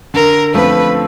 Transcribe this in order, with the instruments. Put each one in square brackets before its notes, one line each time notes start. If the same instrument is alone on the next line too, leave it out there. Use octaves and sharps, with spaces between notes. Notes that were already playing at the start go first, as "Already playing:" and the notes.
[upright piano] D3 [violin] A#4
[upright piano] F3 A3 C4 [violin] B4